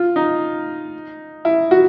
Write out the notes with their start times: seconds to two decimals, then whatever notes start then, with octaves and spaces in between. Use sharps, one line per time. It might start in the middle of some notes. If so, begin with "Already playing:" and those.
Already playing: F4
0.16 D#4
1.45 E4
1.71 F#4